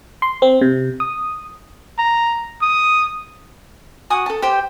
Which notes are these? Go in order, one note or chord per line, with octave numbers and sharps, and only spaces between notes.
C6
C4
C3
D#6
A#5
D#6
F#4 G#5 D#6
A4 A5
G4 C5 G5